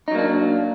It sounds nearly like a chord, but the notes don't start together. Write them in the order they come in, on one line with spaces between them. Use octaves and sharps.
D#4 F#3 A#3 D4